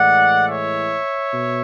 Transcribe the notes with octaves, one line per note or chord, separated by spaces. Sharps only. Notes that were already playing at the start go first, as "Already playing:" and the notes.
Already playing: A2 E3 G#3 D5 F#5
C#5 E5
B2